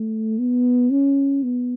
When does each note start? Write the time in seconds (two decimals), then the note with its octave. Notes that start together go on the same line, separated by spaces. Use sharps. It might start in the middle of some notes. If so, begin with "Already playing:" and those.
Already playing: A3
0.39 B3
0.91 C#4
1.43 B3